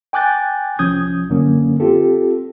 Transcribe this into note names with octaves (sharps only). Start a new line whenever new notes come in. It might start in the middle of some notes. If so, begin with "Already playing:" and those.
G5 G#5 D6 F#6 G6 A6
C2 F3 C#4 D#6 G6 G#6
F#2 D3 F#3 A#3 C#4
C4 F4 G4 A4